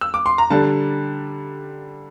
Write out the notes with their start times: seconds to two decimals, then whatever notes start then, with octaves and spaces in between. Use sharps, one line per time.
0.01 E6
0.14 D6
0.26 C6
0.38 A#5
0.50 D3 G3 D4 A5